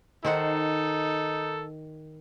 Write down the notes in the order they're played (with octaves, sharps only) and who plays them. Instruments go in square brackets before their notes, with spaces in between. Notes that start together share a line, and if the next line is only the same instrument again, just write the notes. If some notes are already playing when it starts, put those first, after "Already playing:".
[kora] D#3 C5 F#5 [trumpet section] D#4 A4